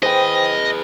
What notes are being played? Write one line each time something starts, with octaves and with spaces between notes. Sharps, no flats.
G#4 B4 C5 D#5 G5